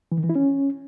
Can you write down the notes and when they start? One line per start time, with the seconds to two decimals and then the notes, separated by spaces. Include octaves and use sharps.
0.12 E3
0.18 D#3
0.24 E3
0.29 E4
0.35 C#4